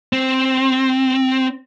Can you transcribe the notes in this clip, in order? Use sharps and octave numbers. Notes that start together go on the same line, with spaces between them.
C4